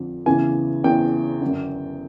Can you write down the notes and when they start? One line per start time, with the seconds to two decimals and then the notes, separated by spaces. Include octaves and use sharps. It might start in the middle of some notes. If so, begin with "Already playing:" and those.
Already playing: F2 D3
0.26 E2 C#3 E3 G#5
0.84 E2 C#3 E3 G5
1.41 F#2 D3